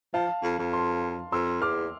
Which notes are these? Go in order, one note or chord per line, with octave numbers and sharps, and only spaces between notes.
F3 F5 A5
F2
F2
A5 C6
F2 C6 E6
E2 D6 F6